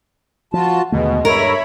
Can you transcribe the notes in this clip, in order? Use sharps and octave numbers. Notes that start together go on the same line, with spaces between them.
F3 F4 F#4 A5
D#2 B2 D3 G#3 A3
G2 A#4 C#5 E5 B5